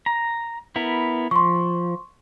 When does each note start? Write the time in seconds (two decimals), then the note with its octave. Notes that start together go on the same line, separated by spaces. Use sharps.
0.06 A#5
0.76 B3 E4 A#4
1.31 F3 C6 C#6